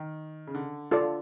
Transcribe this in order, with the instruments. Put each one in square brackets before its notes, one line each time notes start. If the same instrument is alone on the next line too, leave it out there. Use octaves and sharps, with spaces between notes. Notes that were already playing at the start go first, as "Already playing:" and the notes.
Already playing: [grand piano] D#3
C#3
D3
[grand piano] D3 [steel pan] F4 A4 D5